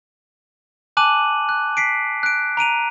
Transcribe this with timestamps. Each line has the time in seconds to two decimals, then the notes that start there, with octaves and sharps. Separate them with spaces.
0.97 G#5 A5 D6 F#6 D#7 F#7
1.49 F#6
1.77 B6 C7 D7
2.23 F#6 D7
2.57 A#5 D7 D#7 F7